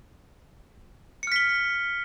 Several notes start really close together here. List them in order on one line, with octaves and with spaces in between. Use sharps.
C#7 F6 B6 G7